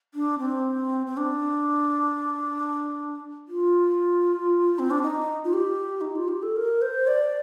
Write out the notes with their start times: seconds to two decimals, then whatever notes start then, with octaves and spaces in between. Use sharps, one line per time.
0.14 D4
0.39 C4
1.06 C4
1.17 D4
3.48 F4
4.79 C4
4.91 D4
5.02 D#4
5.45 F4
5.53 G4
6.01 D#4
6.16 F4
6.28 G4
6.43 A4
6.56 A#4
6.82 C5
7.07 D5